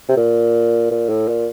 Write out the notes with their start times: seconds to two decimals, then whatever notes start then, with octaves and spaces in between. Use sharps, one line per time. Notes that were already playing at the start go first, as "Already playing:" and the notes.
0.09 C3
0.17 A#2
0.91 A#2
1.09 A2
1.28 A#2